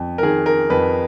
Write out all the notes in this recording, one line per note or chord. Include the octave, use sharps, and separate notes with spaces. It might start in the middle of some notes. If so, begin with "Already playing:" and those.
Already playing: F2
A#4
D#3 G#4
A#4
F2 B4